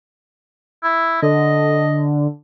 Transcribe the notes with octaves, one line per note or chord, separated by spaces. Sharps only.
E4
D3 D#5